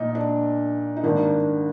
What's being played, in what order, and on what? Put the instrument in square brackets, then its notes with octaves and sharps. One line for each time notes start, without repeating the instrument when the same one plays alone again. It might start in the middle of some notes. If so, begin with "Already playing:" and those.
Already playing: [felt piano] A#1 A#2 D#4
D4
D#4
G#1 G2 D#3 A#3 D4